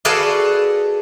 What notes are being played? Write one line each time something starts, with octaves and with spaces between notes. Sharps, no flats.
F#4 G#4 A4 B4 D5 F5